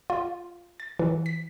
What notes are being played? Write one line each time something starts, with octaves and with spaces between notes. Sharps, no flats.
F4
A6
E3
B6